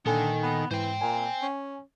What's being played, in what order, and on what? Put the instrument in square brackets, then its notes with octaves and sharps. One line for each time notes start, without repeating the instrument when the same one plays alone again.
[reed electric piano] A#2 A4 G#5 [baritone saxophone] D3 [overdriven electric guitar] D#3
[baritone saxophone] B3
[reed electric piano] G#2 [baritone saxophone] E3 [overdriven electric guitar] C5 G5
[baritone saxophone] A#2 [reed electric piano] G#5
[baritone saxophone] C#4